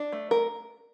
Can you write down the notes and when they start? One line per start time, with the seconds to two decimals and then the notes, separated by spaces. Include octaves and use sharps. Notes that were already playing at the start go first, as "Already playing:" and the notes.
Already playing: D4
0.12 A3
0.31 A#4